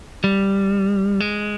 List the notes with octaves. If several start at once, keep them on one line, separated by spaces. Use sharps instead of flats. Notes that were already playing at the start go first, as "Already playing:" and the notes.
G3
G#3